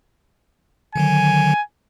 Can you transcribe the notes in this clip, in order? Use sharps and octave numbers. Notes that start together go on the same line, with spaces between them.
D3 D#3 F#3 G#5